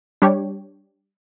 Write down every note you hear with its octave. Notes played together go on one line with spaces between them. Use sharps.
G3 D4 G4 C#5